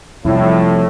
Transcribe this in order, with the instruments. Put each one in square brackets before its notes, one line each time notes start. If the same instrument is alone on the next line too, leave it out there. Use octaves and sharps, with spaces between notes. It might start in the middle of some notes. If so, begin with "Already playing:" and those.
[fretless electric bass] F2 C3 G3 [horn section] A2 [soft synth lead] E4